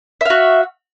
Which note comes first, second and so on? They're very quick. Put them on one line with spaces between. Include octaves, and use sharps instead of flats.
E5 F5 F#4